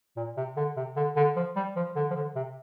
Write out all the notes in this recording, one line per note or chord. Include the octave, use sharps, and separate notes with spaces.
A#2
C3
D3
C3
D3
D3
F3
G3
F3
D3
F3
D3
C3